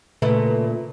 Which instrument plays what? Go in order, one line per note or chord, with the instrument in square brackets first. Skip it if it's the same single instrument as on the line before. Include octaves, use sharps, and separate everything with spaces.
[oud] A#2 A3 E4 [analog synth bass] C#3 [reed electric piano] B4